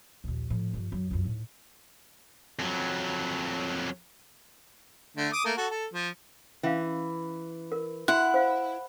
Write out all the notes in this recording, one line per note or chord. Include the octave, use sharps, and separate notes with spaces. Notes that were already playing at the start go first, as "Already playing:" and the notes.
A#1 D#2
A2 F3
G2 F3
F#2
C#2 F#2
A2 D#4
F2 F#3
D3 A3
D6 D#6
A3 A#3
F#4 A4
A4
F3
E3 C#4 F5
A#4
E4 F#4 F#5
C5 F5